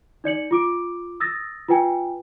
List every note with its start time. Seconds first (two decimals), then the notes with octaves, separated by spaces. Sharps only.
0.24 D#4 D5 C#7 F#7
0.51 F4 D6 D7
1.20 D#6 E6 A6 A#6
1.68 F4 B4 G5 G#5